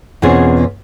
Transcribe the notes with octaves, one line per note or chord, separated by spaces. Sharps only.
E2 B2 C4 C#4 F4 G#4